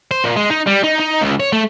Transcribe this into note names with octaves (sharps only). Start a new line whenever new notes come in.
C5
A#2
G#3
D#4
G3
D#4
D#4
C#2
C#5
A3